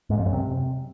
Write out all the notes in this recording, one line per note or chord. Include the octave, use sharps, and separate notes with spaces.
G#2
F2
F#2
C3